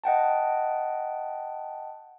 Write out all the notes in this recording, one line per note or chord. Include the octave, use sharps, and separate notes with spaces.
D#5 F#5 G5 A5